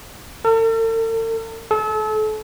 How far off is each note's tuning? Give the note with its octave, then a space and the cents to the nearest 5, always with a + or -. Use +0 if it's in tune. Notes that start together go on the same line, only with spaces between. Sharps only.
A4 +45
A4 -35